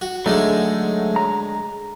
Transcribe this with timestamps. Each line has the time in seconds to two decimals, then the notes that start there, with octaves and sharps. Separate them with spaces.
0.01 F#4
0.26 D3 F#3 G#3 A3 D#4
1.16 A#5